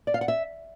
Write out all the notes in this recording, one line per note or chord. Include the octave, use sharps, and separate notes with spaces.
D5
F5
F#5
E5